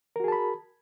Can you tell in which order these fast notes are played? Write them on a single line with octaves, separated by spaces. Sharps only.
A#4 F#4 G#4 A5 B5